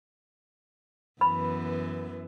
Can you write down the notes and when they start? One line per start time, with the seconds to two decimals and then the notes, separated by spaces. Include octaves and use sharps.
1.21 F#2 E3 B3 B5